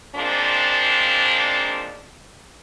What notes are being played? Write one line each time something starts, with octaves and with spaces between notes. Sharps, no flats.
D#2 F3 G#3 A#3 C4 D4